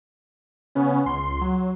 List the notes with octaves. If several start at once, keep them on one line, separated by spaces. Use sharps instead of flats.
C#3 B3 C#4
C#2 C6
F#3